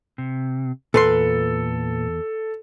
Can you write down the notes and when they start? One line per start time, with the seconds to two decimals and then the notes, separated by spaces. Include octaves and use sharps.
0.18 C3
0.94 E2 A#2 A4 B4 C6